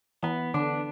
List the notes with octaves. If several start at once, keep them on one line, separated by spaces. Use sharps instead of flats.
E3 B3
D3 D4